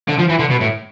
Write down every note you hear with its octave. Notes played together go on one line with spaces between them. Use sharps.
D3
F3
E3
D3
B2
A2